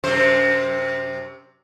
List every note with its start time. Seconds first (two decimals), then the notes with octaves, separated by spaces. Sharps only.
0.04 F#2 C3 C5